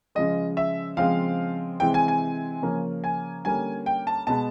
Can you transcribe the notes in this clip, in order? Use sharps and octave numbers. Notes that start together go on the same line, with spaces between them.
C#3 F3 G#3 D#5
E5
C#3 F3 G#3 C4 F5
C3 E3 G#3 C4 G5
G#5
G#5
C#3 F3 A#3 C#4
G#5
D3 G3 A#3 C#4 G#5
G5
A5
B2 G#3 B3 A5